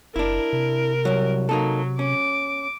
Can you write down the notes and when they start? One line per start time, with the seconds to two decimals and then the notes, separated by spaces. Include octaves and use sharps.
0.16 F#1 D4 E4 A#4
0.53 C3
1.05 C2 F#3
1.49 F#3 A#3 D#4 A4
1.99 C#4 D6